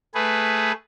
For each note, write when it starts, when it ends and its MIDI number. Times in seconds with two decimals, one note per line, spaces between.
0.14 0.72 57
0.14 0.72 68
0.14 0.72 71